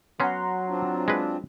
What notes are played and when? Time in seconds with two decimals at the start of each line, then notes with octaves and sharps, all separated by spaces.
0.20 F#3 B3 C#4 F#5 A#5 C6
0.69 C4 D4 F4
1.08 G#3 B4